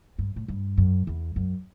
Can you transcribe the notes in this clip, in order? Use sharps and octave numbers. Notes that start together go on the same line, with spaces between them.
G2
A2
G2
F#2
E2
F#2